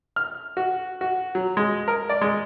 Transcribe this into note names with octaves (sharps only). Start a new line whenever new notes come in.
F6
F#4
F#4
F#3
G#3
A#4
D5
G#3